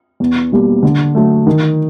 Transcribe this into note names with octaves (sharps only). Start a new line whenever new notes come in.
E2
B2 G3 A#3
D3
F#3 A3
D#3